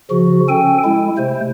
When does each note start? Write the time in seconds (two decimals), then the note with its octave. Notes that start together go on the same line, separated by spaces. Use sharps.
0.11 C#3 F3 F#4
0.49 C#4 A4 G5 G#5
0.84 G#3 E4
1.18 C3 A3 C5